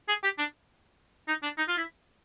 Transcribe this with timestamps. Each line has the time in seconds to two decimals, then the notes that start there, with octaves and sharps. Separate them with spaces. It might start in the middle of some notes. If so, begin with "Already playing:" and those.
0.08 G#4
0.23 G4
0.38 D4
1.28 D#4
1.43 D4
1.57 D#4
1.68 F4
1.77 E4